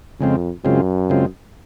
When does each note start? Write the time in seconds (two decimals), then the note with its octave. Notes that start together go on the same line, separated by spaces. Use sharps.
0.20 F2 C#3 G#3 C4 F4
0.65 F#2 C#3 G#3 C4 F4
1.10 C#3 G#3 C4 F4